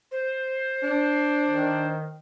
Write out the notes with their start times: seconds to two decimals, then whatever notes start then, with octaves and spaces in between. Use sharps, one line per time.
0.12 C5
0.83 D4
1.49 D#3